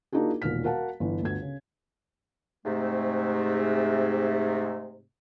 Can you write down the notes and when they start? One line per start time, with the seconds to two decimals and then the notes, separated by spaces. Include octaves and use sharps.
0.12 A#3 D4 D#4 F4 F#4 G#4
0.42 E1 A#2 D#3 F6 B6
0.64 F#4 A#4 F5 F#5 A5
1.00 G1 E3
1.22 G1 D2 G#6
1.42 C#3
2.66 G#2 C3 A3